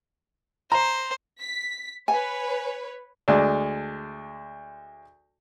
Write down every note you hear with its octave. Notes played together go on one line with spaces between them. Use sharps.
C5 A#5
B6
B4 C#5 G#5
D2 G#3 D4